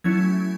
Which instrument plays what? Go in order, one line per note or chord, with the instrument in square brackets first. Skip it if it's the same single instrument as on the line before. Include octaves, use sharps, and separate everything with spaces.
[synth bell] F#3 A3 C#4 E4 G#6